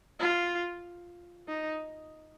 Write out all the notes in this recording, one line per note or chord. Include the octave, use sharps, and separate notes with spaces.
F4
D#4